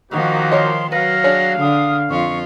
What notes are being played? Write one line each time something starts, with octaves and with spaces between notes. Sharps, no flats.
D#3 F3 A#3 D#4 F#4
A#4 C#5 D#5 C6
F#3 B4 F5 A#6
D4 G#4 C#5
D3 D#6
F2 F4 C#6